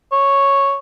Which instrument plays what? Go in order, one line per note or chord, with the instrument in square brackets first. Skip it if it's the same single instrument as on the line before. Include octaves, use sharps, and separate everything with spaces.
[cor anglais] C#5